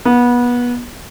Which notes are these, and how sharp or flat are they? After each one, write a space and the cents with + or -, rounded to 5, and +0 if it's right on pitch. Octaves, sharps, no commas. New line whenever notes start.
B3 -25